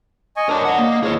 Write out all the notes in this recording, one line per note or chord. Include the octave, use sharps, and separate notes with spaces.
D#5 G#5 C#6
D4 A#4 C#5
C#5 D#5 F#5
A#3
G#4 B4 C#5